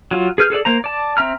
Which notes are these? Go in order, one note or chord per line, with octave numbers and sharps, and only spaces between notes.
F#3 F4
G#4 B4 F6 G6
G#4 A4 B4 D5
A#3 C5 A#5
D5 A5
C4 E5 A#5 F6